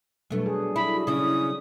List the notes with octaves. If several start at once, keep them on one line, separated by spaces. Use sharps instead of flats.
B2 F#3 G3 A3 D4
G#4
E4 B5
F#4
C#3 C#4 E4 D#6